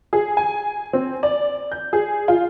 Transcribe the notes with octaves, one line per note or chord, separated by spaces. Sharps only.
G#4
G#5
C4
D5
G6
G#4
F4